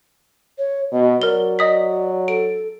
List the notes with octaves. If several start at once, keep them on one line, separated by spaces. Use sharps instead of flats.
C#5
B2 D#5
F#3 A#4 D5 G7
D#5 D#6 B6
A4 D7